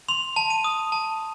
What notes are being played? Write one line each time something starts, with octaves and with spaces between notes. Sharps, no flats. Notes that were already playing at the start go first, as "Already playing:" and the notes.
C6 F7
A5
D#7
D#6
A5